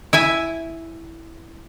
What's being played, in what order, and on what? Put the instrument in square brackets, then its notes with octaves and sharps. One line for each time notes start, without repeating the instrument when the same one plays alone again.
[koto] E4 E5 G#5